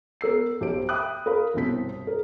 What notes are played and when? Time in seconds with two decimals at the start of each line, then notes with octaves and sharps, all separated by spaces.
0.21 B3 A#4 E6 C7
0.61 B1 G4 C5 D7
0.89 E5 G5 B5 D#6 F#6
1.26 A#4 F5 B5
1.54 G1 C2 B2 C4 B6
2.07 A#4